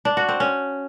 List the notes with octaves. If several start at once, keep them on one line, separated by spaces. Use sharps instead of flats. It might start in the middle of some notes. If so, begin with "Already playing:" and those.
D4
F#4
C4
C#4